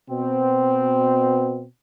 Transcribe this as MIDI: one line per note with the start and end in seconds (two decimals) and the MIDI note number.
0.10 1.65 47
0.10 1.65 60